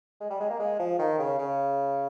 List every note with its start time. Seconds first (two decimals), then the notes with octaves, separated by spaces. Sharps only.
0.20 G#3
0.30 G3
0.40 G#3
0.50 A#3
0.59 G#3
0.79 F3
0.99 D#3
1.19 C#3
1.38 C#3